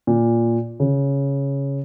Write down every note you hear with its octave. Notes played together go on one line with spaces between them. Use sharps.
A#2
C#3